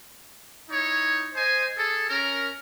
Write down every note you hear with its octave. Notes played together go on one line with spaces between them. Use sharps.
D#4 E4 C#5
C5 D#5 G#5
G#4 A4
C#4 A#4